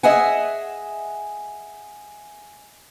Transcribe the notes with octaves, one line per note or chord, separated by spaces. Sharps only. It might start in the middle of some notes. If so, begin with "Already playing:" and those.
G#4 D#5 E5 F#5 G#5